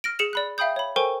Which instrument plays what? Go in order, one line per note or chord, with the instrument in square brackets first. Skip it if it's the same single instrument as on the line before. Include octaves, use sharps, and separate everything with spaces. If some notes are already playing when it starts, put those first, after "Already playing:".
[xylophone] F6 A#6 D7
G#4 C#7 E7 F7
D5 B5 F#6
E5 F5 G5 B5 D#6 G6
C#5 B5
A4 A#4 C5 G5 G#5 C#6